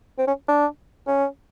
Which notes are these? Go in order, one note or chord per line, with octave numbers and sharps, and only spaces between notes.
C4
C#4
D4
C#4